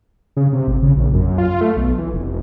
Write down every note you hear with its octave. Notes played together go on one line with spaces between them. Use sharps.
C#3
C3
G#1
C#3
A#1
F#2
F4
A3
B1
E3
F1